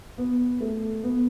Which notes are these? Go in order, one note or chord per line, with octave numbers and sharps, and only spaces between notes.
B3
A3
B3